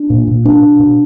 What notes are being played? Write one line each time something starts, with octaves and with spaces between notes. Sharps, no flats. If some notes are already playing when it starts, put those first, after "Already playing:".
Already playing: D4
A#2
A#2
B2 D4
B2
B2